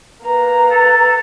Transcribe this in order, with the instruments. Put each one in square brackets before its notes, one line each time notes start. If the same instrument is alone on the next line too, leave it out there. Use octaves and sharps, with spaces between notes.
[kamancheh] A#3 A#5 [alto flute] B4
[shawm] A4